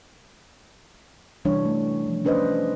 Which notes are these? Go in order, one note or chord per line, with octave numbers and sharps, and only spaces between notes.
C3 E3 G3 D4 C#5
A3
F3
C#4 D4 B4 C5 D5 D#5